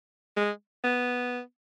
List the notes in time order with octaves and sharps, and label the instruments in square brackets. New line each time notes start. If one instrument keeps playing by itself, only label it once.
[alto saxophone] G#3
B3